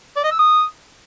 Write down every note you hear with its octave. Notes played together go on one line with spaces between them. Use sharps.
D5
D#5
E6
D#6